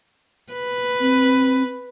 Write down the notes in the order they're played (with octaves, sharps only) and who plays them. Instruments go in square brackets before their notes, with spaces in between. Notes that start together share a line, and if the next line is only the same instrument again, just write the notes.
[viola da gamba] B4
[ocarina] C4